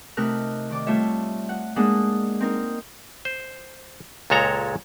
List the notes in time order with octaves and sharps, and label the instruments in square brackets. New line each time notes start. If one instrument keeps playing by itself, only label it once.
[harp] C3 A3 D#4 A#4 F6 F#6
D#3 D5 D6
G3 A3 F4 C#5 E5
F#5
G#3 A#3 D4 F#5 D#6
C4 D#4 A#4
[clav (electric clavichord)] C5
C#2 A#2 G#3 A4 C#5 A#5